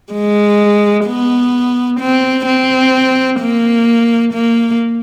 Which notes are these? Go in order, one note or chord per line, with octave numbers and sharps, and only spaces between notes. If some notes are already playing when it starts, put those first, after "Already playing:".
G#3
B3
C4
C4
A#3
A#3